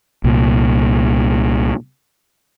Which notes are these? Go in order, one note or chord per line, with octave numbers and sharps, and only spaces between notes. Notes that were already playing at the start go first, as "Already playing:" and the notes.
C2 A#2